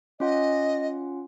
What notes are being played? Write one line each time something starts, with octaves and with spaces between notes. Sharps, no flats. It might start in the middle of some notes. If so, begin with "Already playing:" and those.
C#4 F4 D#5 F#5